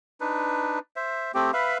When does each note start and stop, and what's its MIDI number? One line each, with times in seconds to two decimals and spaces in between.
0.21 0.79 62
0.21 0.79 63
0.21 0.79 71
0.96 1.32 72
0.96 1.32 76
1.34 1.51 57
1.34 1.51 60
1.34 1.51 67
1.53 1.78 71
1.53 1.78 76
1.53 1.78 77
1.53 1.78 83